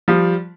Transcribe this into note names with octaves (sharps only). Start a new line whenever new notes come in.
F3 G3